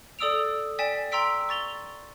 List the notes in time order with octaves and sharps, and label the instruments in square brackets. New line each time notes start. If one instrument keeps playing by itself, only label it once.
[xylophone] A4 D5 D#6 E6 D7 F7
D5 G5 G#5 B6 E7
G5 A#5 C6 E6 B6 D7
C#6 A6 F7 G7